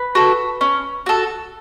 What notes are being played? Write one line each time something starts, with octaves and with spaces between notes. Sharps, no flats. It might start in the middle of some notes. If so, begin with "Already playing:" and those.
Already playing: B4
F#4 A4
C#4
F#4 A4